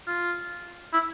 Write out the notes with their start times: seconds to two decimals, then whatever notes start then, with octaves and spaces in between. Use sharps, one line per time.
0.07 F4
0.93 E4